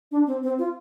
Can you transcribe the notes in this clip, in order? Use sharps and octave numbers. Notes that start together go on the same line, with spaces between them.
D4
C4
C4
F4